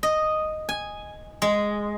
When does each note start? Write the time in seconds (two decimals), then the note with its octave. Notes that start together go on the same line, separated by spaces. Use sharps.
0.03 D#5
0.69 G#5
1.42 G#3